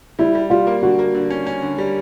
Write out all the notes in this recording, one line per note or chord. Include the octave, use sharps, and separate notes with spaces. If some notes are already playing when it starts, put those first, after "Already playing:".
G3 E4
G3
G3 F4
A#3
D3 F#4
A#3
D3
C#4
C#4
D3
G3